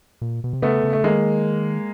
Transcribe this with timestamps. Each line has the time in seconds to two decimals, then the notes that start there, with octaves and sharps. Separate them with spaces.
0.22 A#2
0.44 B2
0.53 C3
0.62 C#3 A3 B3
0.84 C#3
0.93 A3
1.04 D#3 G#3 A#3